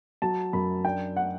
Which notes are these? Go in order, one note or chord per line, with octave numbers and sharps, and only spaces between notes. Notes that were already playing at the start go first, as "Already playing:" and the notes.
F#3 A5
F#2 B5
D4 G5
F#5